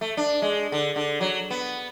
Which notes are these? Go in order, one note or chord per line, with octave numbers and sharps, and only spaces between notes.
A3
D4
G#3
D3
D3
F#3
B3